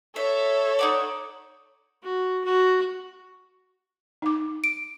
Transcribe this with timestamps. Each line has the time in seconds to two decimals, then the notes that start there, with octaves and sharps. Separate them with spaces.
0.16 A4 C#5 E5
0.79 D#4 F#4 D5
2.03 F#4
2.44 F#4
4.22 D#4 D6
4.64 D7